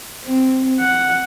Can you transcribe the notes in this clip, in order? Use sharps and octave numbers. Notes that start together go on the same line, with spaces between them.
C4
F#5